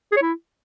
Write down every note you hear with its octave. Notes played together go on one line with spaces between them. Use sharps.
G#4
C#5
E4